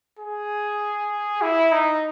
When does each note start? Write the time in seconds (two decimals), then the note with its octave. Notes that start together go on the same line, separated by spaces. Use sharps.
0.19 G#4
1.42 E4
1.72 D#4